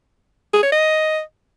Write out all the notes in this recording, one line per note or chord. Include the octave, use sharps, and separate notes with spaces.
G#4
C#5
D#5